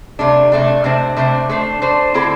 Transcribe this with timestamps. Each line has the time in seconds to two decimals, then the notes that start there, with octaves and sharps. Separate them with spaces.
0.19 C3 A3 D4
0.52 C3 A3 D4
0.84 C3 A3 D4 C5
1.16 C3 A3 D4 C5
1.49 A3 D4 C5
1.82 A3 D4 C5
2.14 D3 C4 E4 A4 C5